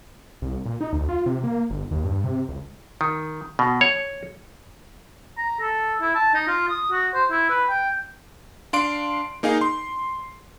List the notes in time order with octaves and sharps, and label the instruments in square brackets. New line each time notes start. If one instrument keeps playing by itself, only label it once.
[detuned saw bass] C2
A#2
D#4
D2
F4
C3
A#3
G1
D#2
G2
C3
C#2
[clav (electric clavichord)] D#3
B2
C#5
[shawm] A#5
A4
E4
A5
D#4
F4
D#6
F#4
C5
E4
B4
G5
[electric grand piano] D4 F5 C6 D7
A#3 D#4 G#4 F5
C6